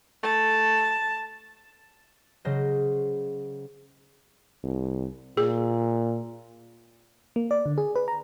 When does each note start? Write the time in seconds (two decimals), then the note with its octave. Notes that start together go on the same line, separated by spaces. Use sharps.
0.23 A3 A5
2.45 C#3 F#3 C5 D#5
4.64 C2
5.37 A#2 G#4
7.36 A#3
7.51 D5
7.66 D3
7.78 G#4
7.96 B4
8.08 A#5